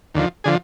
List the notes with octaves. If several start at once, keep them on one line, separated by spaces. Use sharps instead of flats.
D#2 D3 F3
D3 F3 G#4